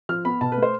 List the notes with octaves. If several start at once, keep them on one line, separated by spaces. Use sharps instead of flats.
F3 F6
B3 B5
B2 A5
B4
A3
C5